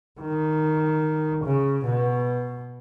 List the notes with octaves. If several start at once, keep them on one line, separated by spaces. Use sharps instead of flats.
D#3
C#3
B2